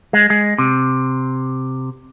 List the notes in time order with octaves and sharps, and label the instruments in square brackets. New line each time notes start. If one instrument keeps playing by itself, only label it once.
[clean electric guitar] G#3
G#3
C3